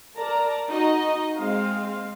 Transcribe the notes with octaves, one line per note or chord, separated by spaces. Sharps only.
A#4 D5 A5 A#5
D#4 F#4 D#5
G#3 C4 F5